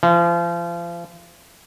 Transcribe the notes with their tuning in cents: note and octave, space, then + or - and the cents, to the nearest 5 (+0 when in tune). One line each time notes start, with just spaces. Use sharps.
F3 -35